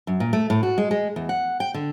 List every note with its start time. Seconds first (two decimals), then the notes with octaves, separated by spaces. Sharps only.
0.07 F#2
0.20 A#2
0.33 A3
0.50 A2
0.63 F#4
0.78 G#3
0.91 G#3
1.16 E2
1.29 F#5
1.60 G5
1.74 D3